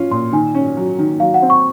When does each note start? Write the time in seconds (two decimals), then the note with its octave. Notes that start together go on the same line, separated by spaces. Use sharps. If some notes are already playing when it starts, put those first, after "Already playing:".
Already playing: C#4 F4
0.11 A#2 C6
0.32 D#3 G#5
0.55 C#4
0.77 F#3
0.99 D#3
1.20 F#3 F5
1.34 F#5
1.42 C4
1.50 C#6